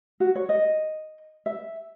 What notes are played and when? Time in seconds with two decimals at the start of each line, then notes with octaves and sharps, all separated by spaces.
0.20 F#4
0.35 C#5
0.49 D#5
1.46 E5